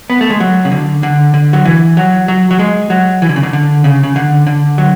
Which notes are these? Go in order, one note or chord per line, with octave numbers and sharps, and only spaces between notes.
B3
A3
G#3
F#3
C#3
D3
D3
D3
F#3
E3
F#3
F#3
F#3
G#3
F#3
E3
D3
C#3
D3
D3
C#3
C#3
D3
D3
F#3